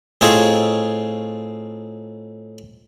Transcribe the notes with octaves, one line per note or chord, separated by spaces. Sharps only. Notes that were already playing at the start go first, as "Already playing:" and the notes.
A2 C4 D#4 F4 G#4 C#5